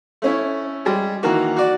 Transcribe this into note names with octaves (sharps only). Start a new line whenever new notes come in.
A3 C#4 E4
G3 G#3
D#3 E3 A#3 F#4
F#4 D5